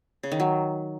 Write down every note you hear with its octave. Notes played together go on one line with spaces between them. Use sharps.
C#3
D#3
F#3